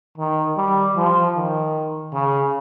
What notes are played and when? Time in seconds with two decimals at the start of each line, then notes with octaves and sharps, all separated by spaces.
0.18 D#3
0.57 G3
0.96 F3
1.36 D#3
2.13 C#3